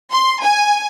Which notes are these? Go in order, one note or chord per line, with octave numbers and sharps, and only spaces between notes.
C6
G#5